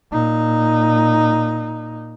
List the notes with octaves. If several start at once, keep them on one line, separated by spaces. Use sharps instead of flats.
A#2 D#4